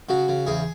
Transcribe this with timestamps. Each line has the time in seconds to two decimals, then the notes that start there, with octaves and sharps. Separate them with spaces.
0.09 C#3 F#4
0.28 C#3
0.46 E2 G#4